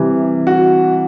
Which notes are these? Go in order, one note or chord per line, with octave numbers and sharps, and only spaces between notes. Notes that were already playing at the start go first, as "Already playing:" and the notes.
Already playing: C3 E3 G3
F#4